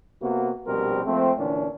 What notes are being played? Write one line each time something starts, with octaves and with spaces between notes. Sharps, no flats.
C3 A#3 B3 F#4
A#1 B2 G3 C4 G4 A#4
F3 A3 A#3 C4
A#2 D3 E3 C#4 D4